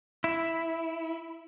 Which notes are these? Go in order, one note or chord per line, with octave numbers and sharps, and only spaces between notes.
E4